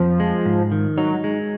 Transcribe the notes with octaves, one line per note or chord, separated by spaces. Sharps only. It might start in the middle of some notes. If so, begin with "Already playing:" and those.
Already playing: F2 F3
G#3
G#2
D#3
F#3 D#4
G#3